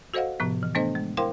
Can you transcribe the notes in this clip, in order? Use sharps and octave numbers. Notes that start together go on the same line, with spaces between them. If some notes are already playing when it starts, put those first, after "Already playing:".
F#4 A4 C5 D#5 F5 F#5
A2 C3 F3 B3
E3
A3 B3 D4 A4 C5 D#5
G#3
E4 A#4 C5 F5 G5 C6